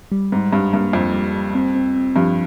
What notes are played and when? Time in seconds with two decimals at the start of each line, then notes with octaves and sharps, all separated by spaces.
0.12 G3
0.32 G#2 G3
0.52 G2 G3
0.73 G2 A#3
0.93 F2 G3
1.14 G3
1.34 G3
1.55 C4
1.75 C4
1.95 C4
2.16 G2 F3